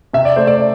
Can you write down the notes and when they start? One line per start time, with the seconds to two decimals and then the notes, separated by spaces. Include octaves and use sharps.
0.13 C3 E5
0.25 D5
0.36 A3 C5
0.47 D5